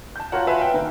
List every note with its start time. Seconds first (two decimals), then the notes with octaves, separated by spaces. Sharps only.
0.16 A5 G6
0.32 F4 F#4 A#4 C#5 F#5
0.47 B4 E5 F5 G#5 A5 C6
0.61 G5
0.74 D#3 B4 A#5